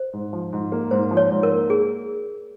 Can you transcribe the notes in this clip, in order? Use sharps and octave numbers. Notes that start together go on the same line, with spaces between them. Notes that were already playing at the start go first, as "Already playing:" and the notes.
Already playing: C5
G#2
F3
G#2
A#3
G#2 C5
F3
C#5
G#2
A#4
A#3
G#4